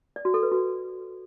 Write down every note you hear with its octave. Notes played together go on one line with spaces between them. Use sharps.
D5
F#4
A4
B4
F#4